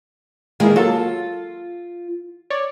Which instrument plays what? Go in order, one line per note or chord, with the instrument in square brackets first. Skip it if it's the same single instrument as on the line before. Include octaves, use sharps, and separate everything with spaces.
[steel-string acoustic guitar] D#3 G#3 A#3 [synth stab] E3 G#4
[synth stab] F#3 A#3 A4 [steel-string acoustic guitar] F4
[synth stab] C#5 D5